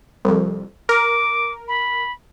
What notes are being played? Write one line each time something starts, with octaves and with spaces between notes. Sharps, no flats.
C2 F2
A#4 D6
B5